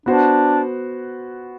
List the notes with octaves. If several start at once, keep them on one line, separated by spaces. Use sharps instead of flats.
B3 D4 F#4 C5